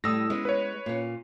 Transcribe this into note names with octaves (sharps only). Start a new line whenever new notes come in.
A2 G3 D#6 E6 A#6
G#3 B3 C#4
B4 C#5
A#2 C#4